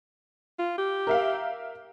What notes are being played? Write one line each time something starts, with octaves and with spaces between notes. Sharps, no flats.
F4
G4
A#4 E5 F5